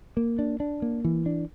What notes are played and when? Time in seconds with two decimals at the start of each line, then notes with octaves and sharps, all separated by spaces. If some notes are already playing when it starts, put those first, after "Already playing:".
0.17 A#3
0.39 D4
0.60 D4
0.82 A#3
1.04 E3
1.26 D4